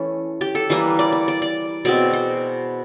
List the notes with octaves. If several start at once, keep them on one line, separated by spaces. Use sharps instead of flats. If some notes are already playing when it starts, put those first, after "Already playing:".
Already playing: E3 A3 C#4
G4
A4
E3 G3 A#3 B4
D5
D5
D5
D5
B2 G#3 C4 D5
C5